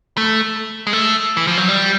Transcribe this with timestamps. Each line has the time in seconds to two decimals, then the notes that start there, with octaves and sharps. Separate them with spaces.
0.17 A3
0.87 G#3
0.93 A3
1.37 E3
1.47 F3
1.58 F#3
1.68 G3